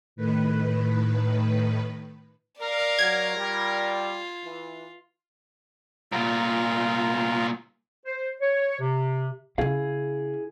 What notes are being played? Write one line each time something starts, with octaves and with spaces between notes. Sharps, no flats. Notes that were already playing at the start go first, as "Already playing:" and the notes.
A2 D#3 B4
A#4 D5 F5
F#3 G#6
G3 F4
E3
C2 A#2 F4 A#5
C5
C#5
C3
C#3 C#4 E4 G#4 F5